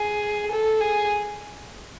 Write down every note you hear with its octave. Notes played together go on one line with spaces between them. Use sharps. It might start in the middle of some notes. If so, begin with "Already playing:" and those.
Already playing: G#4
A4
G#4